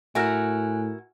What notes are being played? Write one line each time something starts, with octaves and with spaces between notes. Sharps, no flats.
A2 E4 F#4 A#4 G#5 F6 F#6